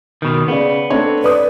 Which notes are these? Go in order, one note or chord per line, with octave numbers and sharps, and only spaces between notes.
B2 D#3
C#3 B3 D5
A3 C4 D4 C#5
B4 D5 D#6